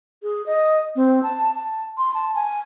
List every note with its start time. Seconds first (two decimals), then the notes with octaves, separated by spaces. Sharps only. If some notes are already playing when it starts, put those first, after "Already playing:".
0.23 G#4
0.46 D#5
0.96 C4
1.23 A5
1.55 A5
1.98 C6
2.14 A5
2.35 G#5